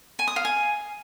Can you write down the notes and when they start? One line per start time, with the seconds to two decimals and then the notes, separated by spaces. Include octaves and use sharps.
0.19 G#5
0.28 D#6
0.36 F5
0.45 G#5